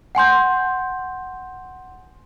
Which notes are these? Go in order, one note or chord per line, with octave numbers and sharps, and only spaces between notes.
F#5 G#5 C6 G6